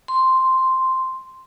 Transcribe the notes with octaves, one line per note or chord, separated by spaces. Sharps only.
C6